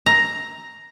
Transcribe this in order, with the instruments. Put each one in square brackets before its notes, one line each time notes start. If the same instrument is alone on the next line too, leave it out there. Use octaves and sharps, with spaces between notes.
[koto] A#5